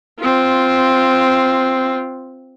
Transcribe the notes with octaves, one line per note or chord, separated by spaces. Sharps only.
C4 F4